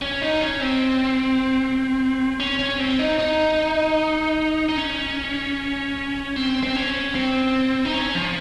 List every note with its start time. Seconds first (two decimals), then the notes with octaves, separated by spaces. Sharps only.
0.02 C#4
0.22 D#4
0.41 C#4
0.61 C4
2.40 C#4
2.59 C#4
2.79 C4
2.99 D#4
3.19 D#4
4.69 D#4
4.77 C#4
6.36 C4
6.63 C4
6.75 C#4
7.15 C4
7.85 D#4
7.94 C#4
8.15 F3